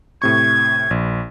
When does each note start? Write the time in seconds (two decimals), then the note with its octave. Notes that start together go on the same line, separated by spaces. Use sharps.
0.22 A2 C3 C#6 G#6
0.91 A#1